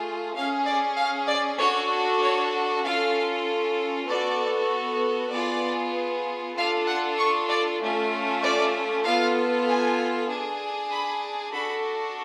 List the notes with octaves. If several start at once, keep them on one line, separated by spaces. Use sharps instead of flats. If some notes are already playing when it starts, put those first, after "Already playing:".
Already playing: A3 F4 G#4
C#4 G#4 F5
D5
F5
D5
D4 F#4 A4 C#5
C#5
C#4 F4 A4 F5
B3 F#4 A4 D5
B3 F4 G#4 D5
D4 F4 A4 F5
F#5
C#6
D5
A3 C#4 F4
D5
B3 F4 A4 F5
G#5
D4 G#4
B5
D4 F#4 A4 B5